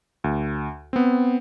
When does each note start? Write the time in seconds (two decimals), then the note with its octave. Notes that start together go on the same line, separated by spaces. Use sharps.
0.24 D2
0.93 B3 C4